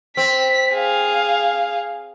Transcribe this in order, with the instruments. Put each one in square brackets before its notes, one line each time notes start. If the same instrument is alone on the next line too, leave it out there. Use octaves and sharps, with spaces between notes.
[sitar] C4 [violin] B6
[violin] G#4 F5